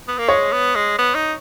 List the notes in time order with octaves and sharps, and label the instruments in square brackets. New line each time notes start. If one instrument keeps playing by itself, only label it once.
[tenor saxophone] B3
A#3
[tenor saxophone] G#3 [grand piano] C#5
[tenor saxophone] B3
G#3
B3
D#4